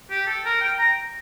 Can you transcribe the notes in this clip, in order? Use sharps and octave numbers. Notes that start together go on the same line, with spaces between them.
G4
A4
A#4
G5
A#5